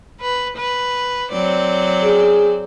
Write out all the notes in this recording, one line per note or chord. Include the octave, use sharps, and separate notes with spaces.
B4
B4
F#3 C4 D5
G#4